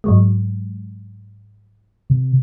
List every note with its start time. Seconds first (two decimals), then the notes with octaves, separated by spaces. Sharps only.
0.04 G#2 F#3 G#3
2.10 C3